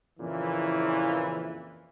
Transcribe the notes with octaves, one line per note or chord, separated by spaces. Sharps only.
F2 A#2 C#3 E3